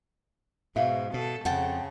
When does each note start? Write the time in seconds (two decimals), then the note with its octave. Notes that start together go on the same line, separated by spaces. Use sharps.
0.76 G#2 B2 E5 F5
1.14 B2 A4
1.45 F2 C#3 F#5 G5 A5